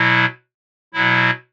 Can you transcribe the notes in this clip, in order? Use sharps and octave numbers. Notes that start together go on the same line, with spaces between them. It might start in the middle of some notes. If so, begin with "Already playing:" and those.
Already playing: B2 F#3 E4
B2 F#3 E4